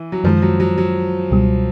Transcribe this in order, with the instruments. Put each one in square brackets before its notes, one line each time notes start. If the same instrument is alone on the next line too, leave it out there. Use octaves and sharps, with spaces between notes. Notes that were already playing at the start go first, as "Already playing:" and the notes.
Already playing: [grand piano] E3
F#3
[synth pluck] F#2 D#3 G#3 [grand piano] F3
[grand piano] F#3
F#3
F#3
[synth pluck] C#2 B2 G3